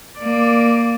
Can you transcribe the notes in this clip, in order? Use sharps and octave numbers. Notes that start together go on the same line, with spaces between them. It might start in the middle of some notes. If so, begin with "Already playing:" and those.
A#3 D5